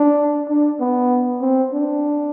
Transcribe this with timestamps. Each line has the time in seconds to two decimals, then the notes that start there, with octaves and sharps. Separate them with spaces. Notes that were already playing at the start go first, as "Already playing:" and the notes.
Already playing: D4
0.49 D4
0.80 B3
1.42 C4
1.73 D4